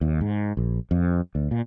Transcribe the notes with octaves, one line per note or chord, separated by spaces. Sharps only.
D#2
G#2
A#1
F2
D2
A#2